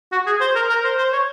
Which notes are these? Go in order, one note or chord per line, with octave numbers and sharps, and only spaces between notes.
F#4
G#4
C5
A#4
A#4
C5
C5
C#5